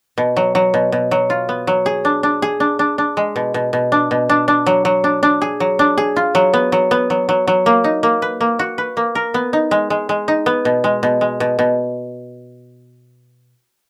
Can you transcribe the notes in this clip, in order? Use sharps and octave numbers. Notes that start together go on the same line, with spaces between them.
B2
F#3
F#3
B2
B2
F#3
F4
B3
F#3
G#4
D4
D4
G#4
D4
D4
D4
G#3
B2
B2
B2
D4
B2
D4
D4
F#3
F#3
D4
D4
G#4
F#3
D4
G#4
F4
F#3
B3
F#3
B3
F#3
F#3
F#3
A#3
D#4
A#3
B4
A#3
F#4
B4
A#3
A#4
B3
D#4
G#3
G#3
G#3
D#4
B3
B2
G#3
B2
G#3
B2
B2